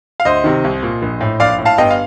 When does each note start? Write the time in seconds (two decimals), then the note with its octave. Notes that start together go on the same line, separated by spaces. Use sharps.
0.20 F5
0.25 D2 C5 D#5
0.44 C3 D#3
0.64 C2
0.83 A#2
1.02 A#1
1.21 A2
1.40 A#1 D5 F5
1.59 A2
1.65 F5 A5
1.78 G1 D#5 G5
1.91 F5